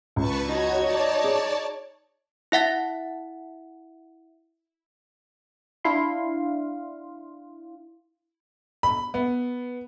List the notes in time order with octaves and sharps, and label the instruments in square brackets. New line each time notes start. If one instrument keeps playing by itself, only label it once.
[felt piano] C#2 [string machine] B4 A5 C#6
[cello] D#4 [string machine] F#4 C#5 G#6
[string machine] C#5 D5 A5
[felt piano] G#4
[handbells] E4 E5 F#5 A6
[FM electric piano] D4 E4 F5 C6
[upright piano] B5
B3